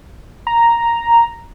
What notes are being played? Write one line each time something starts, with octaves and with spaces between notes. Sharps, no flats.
A#5